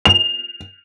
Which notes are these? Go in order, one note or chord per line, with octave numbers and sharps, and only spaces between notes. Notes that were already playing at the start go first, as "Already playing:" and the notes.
F7